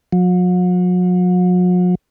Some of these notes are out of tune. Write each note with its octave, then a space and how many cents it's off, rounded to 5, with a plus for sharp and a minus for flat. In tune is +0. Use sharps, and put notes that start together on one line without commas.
F#3 -45